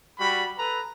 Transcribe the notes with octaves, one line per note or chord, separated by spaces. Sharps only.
G3 F#4 B5
A4 B4 A#5